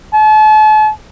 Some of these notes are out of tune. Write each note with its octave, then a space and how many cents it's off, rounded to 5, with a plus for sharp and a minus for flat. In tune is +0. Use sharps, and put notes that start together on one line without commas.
A5 -40